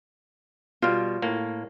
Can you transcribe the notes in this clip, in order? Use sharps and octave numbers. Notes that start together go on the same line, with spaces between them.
B2 G3 F4
A2 A#3